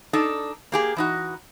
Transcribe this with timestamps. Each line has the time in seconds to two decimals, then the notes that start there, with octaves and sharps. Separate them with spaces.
0.13 D4 D#4 A4
0.72 A#3 G4 G#4
0.96 E3 D#4 F#4